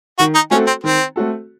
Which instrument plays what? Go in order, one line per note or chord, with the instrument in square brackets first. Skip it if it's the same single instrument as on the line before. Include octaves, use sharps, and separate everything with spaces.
[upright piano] D#3 [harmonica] F#4
[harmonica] D#4
[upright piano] A3 C4 F#4 A4 [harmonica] C#4
[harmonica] C4
[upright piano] D#3 [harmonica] C4
[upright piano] A3 C4 F#4 A4